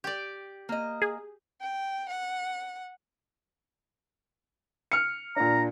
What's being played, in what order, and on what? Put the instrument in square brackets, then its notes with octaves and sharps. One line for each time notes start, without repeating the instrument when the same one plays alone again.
[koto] G4 D5
[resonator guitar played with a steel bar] A#3 D#5
[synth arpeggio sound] G#4
[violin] G5
F#5
[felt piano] F6 C#7
[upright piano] A#2 D4 [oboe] A#5